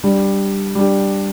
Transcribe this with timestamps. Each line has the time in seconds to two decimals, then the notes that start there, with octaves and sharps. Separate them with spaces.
0.04 G3 D4 G4
0.75 G3 D4 G4